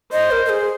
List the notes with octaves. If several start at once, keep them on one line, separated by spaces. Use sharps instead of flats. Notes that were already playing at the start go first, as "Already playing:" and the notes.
C5 D#5
A#4
A#4
G#4